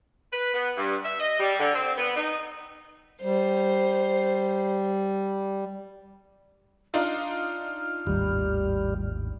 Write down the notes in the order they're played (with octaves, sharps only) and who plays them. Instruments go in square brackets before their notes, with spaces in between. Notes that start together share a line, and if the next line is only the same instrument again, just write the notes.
[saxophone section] B4
B3
G2
E5
D#5
G3
D3
C4
B3
D#4
[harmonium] G3 [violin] C5
[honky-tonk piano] D4 D#4 F4 [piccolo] F6
[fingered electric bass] G#1 D#2 A2 [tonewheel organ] G3